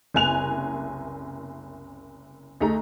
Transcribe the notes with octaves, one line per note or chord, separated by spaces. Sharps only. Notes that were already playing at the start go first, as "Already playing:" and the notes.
F#1 C2 B3 G#5 F#6 F7
D2 A3 D#4 G#4 A#5